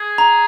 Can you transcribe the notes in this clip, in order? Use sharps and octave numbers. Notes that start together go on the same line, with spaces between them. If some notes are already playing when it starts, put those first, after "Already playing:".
Already playing: G#4
A#5